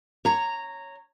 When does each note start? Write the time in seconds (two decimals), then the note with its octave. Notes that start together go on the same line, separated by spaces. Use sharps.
0.25 C#5 A#5